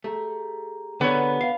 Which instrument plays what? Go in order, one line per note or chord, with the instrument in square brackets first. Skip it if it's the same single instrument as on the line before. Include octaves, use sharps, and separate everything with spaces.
[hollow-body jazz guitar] A3 [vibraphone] G4 G#4 A#5
[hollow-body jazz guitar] D3 C#5 [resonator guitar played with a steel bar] B3
[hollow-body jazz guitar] F5